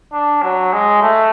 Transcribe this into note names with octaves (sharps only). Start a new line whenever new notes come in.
D4
F#3
G#3
A3